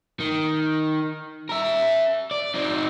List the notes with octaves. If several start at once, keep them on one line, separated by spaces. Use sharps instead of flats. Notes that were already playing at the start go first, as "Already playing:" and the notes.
D#3
A#4 E5
D5
C4 D#4